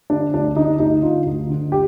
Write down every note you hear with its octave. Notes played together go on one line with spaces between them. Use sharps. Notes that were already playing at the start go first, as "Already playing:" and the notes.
D3 D4
D2 D4
D3 D#4
D2 D#4
D3 F4
D2
D3
G4